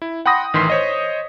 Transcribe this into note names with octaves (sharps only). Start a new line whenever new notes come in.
E4
F#5 G5 B5 C6 D#6 A#6
A1 D#3 E3 C6 B6 C7
C5 C#5 D#5